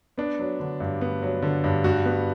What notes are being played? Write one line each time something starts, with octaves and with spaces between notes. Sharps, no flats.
B3 D4
F#3
D3
G2
B3
F#3
D3
G2
G2 F#4
B3